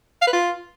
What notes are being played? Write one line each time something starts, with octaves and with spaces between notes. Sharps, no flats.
F5
B4
F4